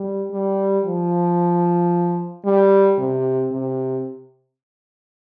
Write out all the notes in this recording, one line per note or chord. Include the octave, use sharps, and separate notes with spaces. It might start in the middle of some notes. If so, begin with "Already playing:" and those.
Already playing: G3
G3
F3
G3
C3
C3